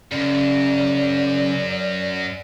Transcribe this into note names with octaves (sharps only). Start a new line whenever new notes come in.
F#2 C#3 D5